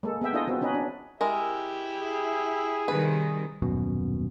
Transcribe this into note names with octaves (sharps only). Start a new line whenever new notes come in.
G#3 A#3 A4
B3 G#4 E5 G5
D4 E4 F4 G#4 A4 D#5
B3 C4 F#4
B3 C#4 D#4 B4 D#5
D4
G#3 E4 G4 A#4 E5
G#4
C3 D#3 G3 B4
D#1 F#2 B2